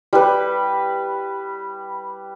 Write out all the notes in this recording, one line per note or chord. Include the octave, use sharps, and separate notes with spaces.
G3 B4